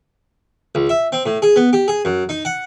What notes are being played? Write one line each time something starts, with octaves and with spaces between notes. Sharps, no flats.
C#2
E5
C4
A2
G#4
B3
G4
G#4
F#2
D#4
F#5